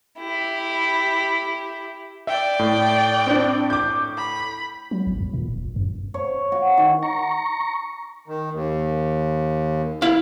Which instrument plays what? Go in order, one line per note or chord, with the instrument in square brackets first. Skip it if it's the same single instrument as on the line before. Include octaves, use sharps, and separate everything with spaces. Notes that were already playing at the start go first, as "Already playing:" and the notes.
[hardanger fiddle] E4 G4
[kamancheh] D5 G5 [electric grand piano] E5
[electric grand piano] A2
[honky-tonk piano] C4 D4
D6 G6
[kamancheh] B5
[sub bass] F#3
G#1
E2
A#2
D#1
F#1
F#2
[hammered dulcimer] C#5
F#4
D#3
[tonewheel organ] A#5 C#6
[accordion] D#3
D#2
[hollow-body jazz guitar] E4 F5